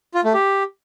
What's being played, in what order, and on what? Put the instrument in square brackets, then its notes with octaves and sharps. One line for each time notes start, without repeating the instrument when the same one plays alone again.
[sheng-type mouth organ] F4
A3
G4